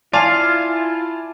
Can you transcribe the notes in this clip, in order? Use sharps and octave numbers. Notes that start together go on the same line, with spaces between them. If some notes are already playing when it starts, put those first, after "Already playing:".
E4 F4 D5 F5 G#5 A5